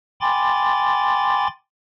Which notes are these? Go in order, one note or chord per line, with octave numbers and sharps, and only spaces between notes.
G5 G#5 B5 C6 D6 A6